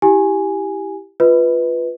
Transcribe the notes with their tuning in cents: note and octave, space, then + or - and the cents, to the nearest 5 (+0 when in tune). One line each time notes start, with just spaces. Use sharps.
E4 +0 G4 +0 G#5 +0
F4 +0 B4 +0 D#5 +30